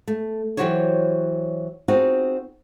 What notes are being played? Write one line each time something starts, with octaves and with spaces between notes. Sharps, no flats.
A3
E3 F#3 F#4 G4 C5 C#5
C4 D#4 F4 F#4 G#4